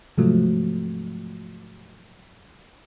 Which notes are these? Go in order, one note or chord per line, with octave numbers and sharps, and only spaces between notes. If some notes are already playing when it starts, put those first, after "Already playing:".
G#2 C3 F3 F#3 A3